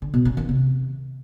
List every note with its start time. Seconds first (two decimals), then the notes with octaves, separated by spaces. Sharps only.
0.02 D3
0.14 B2
0.25 C#4
0.37 D#3
0.49 C3